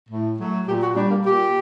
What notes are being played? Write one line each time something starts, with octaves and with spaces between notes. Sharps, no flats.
A2
F#3 A3
A#2 G4
F#4
G3 D4
A#3
A#2 G4